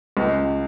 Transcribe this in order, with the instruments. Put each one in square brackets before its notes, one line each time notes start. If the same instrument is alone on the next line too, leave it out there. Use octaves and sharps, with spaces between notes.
[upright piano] C#2